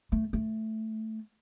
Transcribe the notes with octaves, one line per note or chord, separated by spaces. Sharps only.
A3
A3